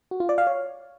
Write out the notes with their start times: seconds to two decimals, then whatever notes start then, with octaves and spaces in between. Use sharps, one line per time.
0.11 F#4
0.20 F4
0.29 D5
0.38 F5
0.47 C#5